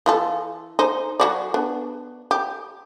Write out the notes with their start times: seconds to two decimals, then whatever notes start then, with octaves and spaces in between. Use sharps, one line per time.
0.06 E3 F4 A4
0.79 D#4 C5
1.20 F#3 F#4 D5
1.54 B3 D4
2.31 G4